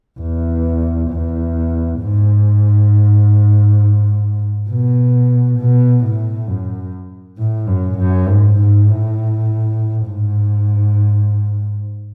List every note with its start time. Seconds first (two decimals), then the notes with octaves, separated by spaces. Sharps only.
0.20 E2
1.10 E2
2.00 G#2
4.70 B2
5.58 B2
6.04 A2
6.48 F#2
7.38 A2
7.68 F#2
7.99 F#2
8.28 G#2
8.59 G#2
8.88 A2
10.08 G#2